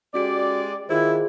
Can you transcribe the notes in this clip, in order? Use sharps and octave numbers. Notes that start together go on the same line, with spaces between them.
G#3 C#4 F#4 G4 D5 D7
D#3 E4 F4 G#4 C5